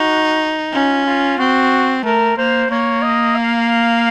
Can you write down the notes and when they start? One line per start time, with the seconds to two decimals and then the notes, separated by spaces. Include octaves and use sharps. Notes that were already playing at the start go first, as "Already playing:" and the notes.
Already playing: D#4 F#4
0.73 C#4 F4
1.07 F4
1.39 C4 F#4
2.04 A3 A#4
2.37 A#3 C5
2.71 A#3 C#5
3.03 D#5
3.35 F5